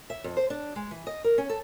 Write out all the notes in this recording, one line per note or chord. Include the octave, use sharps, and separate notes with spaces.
E5
F2
C5
D4
G#3
E3
D#5
A#4
C#4
A4